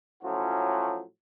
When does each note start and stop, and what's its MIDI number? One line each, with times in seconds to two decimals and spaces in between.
0.23 1.02 45
0.23 1.02 53
0.23 1.02 54
0.23 1.02 61
0.23 1.02 65
0.23 1.02 66